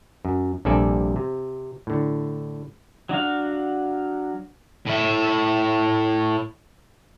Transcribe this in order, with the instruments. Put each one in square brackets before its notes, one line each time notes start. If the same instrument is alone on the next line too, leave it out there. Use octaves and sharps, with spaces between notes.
[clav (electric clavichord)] F#2
A#1 G2 C3 A4 D5 G#5
C3
A2 D3
[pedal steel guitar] F#3 D4 F#4 F5
[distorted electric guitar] A2 E5